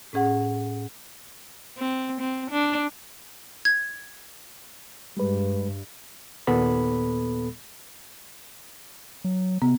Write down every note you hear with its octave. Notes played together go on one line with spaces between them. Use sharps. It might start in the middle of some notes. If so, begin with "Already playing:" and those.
A2 C#4 G#4 F#5
C4
C4
D4
G#6
G2 G3 G#3 B4
D#2 A#2 B3 A4 B5
F#3
C3 B3